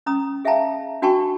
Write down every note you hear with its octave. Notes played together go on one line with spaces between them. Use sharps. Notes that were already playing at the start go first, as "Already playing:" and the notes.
C#4 A#5 D#6
G#4 E5 F5 G5 A5 A#5
D4 F#4 G5 A5 B5 C#6